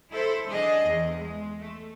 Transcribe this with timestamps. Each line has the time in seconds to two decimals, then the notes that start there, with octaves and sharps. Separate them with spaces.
0.12 E4 A4 C5
0.48 D4 G#4 D#5
0.84 E2
1.18 G#3
1.60 A3